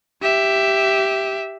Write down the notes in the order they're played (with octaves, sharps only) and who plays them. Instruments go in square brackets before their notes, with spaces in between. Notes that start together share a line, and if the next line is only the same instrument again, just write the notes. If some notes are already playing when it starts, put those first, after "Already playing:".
[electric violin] G4 E5